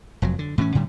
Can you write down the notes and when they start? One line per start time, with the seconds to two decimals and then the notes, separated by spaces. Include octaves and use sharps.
0.22 F1 F2 F#3
0.39 D3
0.58 A2 E3 C4 C#4
0.75 A2 D3 G3